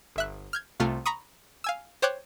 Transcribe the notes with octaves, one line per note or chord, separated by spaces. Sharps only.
G1 E5 F#6
F6 G6 G#6
C2 C3 A3 F4 F6
A#5 B5 C#6 D#6
F5 G#5 E6
C5 C#5 G5 D6 F#6 G#6